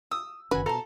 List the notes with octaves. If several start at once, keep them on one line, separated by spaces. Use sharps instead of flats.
D#6 E6
F#1 D#3 C#4 F#4 B4 G#5
B2 A4 C5 A5 A#5